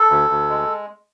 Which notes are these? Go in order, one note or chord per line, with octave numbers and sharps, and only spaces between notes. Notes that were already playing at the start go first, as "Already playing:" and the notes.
Already playing: A4
D2
D2
G#3